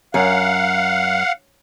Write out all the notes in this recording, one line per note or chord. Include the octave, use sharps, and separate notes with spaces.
F#2 F5 F#5